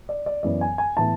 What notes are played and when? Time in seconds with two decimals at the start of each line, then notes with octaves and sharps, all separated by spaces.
0.09 D5
0.26 D5
0.43 F#2 E3 B3 D5
0.61 G#5
0.78 G#5
0.97 A2 E3 B3 A5